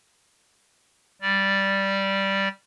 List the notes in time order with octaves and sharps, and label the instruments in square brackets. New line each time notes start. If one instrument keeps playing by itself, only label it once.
[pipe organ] G3 D5